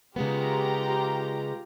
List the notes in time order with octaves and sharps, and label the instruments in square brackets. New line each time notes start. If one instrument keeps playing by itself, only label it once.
[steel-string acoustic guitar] C#3 G#3 B3 [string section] F4 G4 A#5